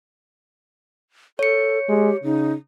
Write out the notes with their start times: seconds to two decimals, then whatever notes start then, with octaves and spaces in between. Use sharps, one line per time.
1.39 A4 C#5 C#7
1.89 G#3 G4
2.24 C#3 D#4